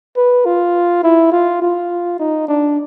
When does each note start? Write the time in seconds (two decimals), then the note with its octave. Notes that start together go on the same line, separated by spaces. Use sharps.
0.16 B4
0.45 F4
1.03 E4
1.32 F4
1.62 F4
2.20 D#4
2.48 D4